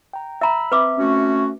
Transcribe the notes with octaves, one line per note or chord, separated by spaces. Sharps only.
G5 A#5
E5 A#5 B5 E6
C4 B4 E5 D6
A3 C#4 F#4